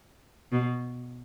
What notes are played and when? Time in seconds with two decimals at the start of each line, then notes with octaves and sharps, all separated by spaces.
0.52 B2